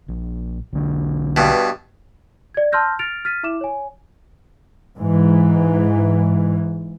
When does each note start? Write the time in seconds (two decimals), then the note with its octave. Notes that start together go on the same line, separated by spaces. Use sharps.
0.08 A#1
0.73 B1 D3 D4
1.37 G2 B2
2.54 D5 G#6
2.72 A5 C6 E6 F6 G6 A#6
2.99 F6 A6 A#6 C#7 D7 F7
3.25 F6 A6 B6 D#7
3.43 E4 E5 D6 E7
3.61 C#5 G#5
4.96 G#2 E3